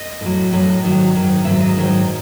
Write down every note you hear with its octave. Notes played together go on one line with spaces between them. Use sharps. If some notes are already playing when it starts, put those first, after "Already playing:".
Already playing: D#5
A2 F#3
A2 F#3 D#5
G#2 D#3 F#3
G#2 D#3 F#3
G#2 D#3 F#3 E5
D#5
G#2 D#3 F#3